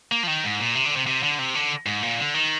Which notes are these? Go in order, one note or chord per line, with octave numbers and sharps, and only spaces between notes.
A#3
F3
D#3
G#2
A#2
C3
D3
C3
C3
D3
C3
D3
G#2
A#2
D3
D#3